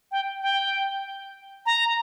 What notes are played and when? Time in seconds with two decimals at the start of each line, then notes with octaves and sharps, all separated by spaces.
0.12 G5
0.42 G5
1.66 A#5